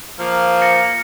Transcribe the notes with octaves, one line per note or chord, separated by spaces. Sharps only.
F3 A#3
A6 A#6 C#7